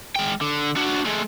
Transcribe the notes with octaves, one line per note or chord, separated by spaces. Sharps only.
G#3 G5
D3
D4 F#4
G#3 A3